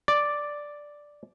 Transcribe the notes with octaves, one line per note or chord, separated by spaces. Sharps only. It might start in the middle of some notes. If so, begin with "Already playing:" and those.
D5